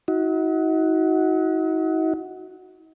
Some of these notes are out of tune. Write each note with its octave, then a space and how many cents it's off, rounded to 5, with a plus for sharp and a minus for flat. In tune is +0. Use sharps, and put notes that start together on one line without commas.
D#4 +45 F#4 +0